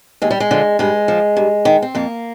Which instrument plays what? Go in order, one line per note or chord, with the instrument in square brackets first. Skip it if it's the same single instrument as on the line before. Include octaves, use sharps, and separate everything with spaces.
[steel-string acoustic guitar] D#2 G#3
G3
G#3
D3 F3
G2 G#3
F3
G2
D#3
C4
F2 A#3